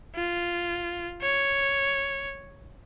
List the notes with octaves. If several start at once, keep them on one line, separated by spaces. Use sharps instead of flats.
F4
C#5